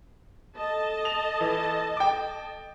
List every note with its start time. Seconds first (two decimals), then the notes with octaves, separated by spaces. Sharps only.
0.56 A4 D#5 A5
1.05 F7
1.41 E3
1.97 G5 D6